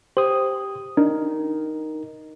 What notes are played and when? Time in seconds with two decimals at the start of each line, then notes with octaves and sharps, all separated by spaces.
0.17 G4 C5 D#6
0.97 D4 D#4 A#4